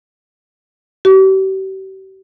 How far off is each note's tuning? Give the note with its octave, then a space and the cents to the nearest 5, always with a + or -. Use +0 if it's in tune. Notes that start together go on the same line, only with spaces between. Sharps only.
G4 -40